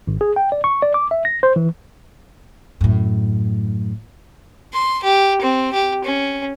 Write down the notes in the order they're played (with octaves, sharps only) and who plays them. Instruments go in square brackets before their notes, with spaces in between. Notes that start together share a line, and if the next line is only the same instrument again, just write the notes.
[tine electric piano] G#1
G#4
G5
D5
C#6
D5
D6
E5
A#6
C5
E3
[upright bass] F#2 A2
[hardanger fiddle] C6
G4
C4
G4
C#4